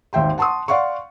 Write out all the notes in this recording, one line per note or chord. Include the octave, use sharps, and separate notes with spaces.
G#1 D#2 E5 G5 C6
F#5 A5 C6 C#6 D#6
D5 F5 F#5 C6 C#6